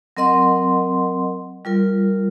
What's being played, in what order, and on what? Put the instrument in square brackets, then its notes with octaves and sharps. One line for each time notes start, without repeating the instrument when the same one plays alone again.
[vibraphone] F#3 C4 A#4 D#5 F#5 C6
G3 F4 A#4